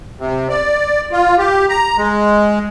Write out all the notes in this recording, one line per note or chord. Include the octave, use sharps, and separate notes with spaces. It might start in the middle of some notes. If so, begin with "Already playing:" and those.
C3
D5
F4
G4
A#5
G#3